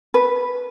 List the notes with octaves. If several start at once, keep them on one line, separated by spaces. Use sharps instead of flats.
B4